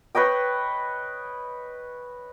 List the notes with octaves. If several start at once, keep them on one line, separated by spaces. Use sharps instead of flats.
B4 C#5 D#5 G5